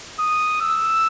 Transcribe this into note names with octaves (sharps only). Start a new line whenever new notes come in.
D#6
E6